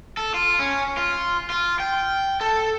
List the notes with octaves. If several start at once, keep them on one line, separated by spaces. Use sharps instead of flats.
A4
F4
C#4
F4
F4
G5
A4